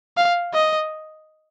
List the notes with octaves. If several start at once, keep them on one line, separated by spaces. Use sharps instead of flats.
F5
D#5